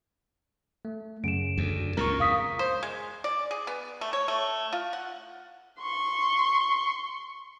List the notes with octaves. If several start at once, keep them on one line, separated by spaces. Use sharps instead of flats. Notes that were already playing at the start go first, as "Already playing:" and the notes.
A3
F#2 C#3 D7 E7
D2
C#2 G2 A#2 A#4 A#5 C#6
E2 F5 D#6 B6
C5
G#3
D5
G#4
B3
A3
C#5
A3
F4
F#5
C6 C#6